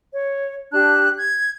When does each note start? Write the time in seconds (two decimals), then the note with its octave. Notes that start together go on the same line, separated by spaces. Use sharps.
0.12 C#5
0.72 D4 G4 A5 F#6
1.17 G#6